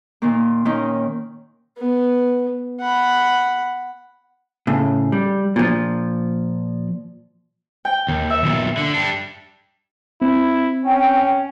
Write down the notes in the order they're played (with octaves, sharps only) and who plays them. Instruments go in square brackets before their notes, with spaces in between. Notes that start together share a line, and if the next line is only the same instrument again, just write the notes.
[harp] A#2 D#3 A#3
D#3 A#3 C#4 D#4
[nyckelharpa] B3
F#5 B5
[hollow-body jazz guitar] A2 C#3
G3
A#2 F3
[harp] G5
[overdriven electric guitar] D#2
[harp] E5
[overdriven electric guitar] B1 A#2
D3
G3 D4
[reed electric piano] C4 [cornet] E4
[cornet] C#4 [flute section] G5